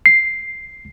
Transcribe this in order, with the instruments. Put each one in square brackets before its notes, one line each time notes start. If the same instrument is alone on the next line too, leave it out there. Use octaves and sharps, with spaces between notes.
[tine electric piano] C7